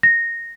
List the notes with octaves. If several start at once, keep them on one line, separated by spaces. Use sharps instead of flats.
A#6